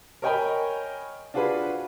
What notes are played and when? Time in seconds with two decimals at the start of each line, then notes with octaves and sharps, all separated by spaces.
0.22 A#4 C#5 D#5 G5 G#5 B5
1.34 D4 F4 F#4 G#4 B4